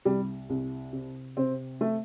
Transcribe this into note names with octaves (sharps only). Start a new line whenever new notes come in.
C2 G3
C2
C3
C3 C4
A3